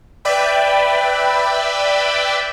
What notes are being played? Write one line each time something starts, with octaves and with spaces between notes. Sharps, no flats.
B4 D5 E5 G5 B5